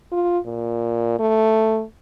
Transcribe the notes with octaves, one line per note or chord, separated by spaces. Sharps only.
F4
A#2
A3